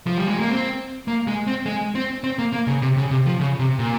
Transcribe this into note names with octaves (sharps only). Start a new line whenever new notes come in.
F3
G3
G#3
A#3
C4
A#3
G#3
C4
G#3
C4
C4
A#3
A#3
C#3
C3
C#3
C3
F3
C#3
C3
A#2